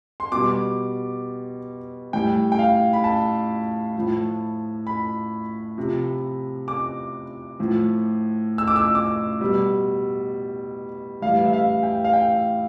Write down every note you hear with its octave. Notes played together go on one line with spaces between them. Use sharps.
C6
B2 G3 D6
A2 G3 G5
G5
F5
B5
A5
A2 F3
B5
C3 F3
D6
A2 F3
E6
D6
E6
D6
B2 G3
A2 E3 G3 F5
E5
F5
G5
F5
G5